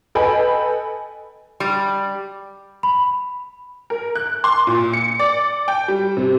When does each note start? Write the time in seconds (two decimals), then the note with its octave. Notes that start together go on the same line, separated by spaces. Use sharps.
0.15 A4 B4 D#5 G5 G#5 B5
1.60 G3
2.83 B5
3.90 A#4
4.15 F#6
4.44 C6
4.67 A#2
4.93 C#7
5.19 D5
5.68 G5
5.88 G3
6.17 C3